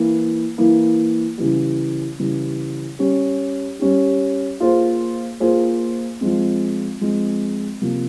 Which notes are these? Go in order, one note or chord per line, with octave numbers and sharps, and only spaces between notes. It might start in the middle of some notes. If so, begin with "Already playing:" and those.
Already playing: E3 A#3 E4
E3 A#3 E4
C#3 E3 G3
C#3 E3 G3
G3 C#4 G4
G3 C#4 G4
A#3 F4 G#4 C5
A#3 F4 G#4 C5
F3 G#3 C4
F3 G#3 C4
C3 F3 A#3